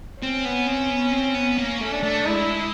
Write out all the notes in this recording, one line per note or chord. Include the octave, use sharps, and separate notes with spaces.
C4 C#4
B3
C4
B3
C4
B3
A#3 C#4
A3
D4
A3
G#3 E4